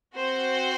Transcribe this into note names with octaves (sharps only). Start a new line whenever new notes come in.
C4 F#4 C5